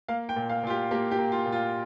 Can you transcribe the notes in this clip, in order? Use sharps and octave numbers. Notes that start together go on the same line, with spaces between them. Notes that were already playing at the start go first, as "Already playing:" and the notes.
A#3 F5
G5
A#2
F5
A#2 F4
G4
A#3 G4
G4
A#3
F4
A#2
F4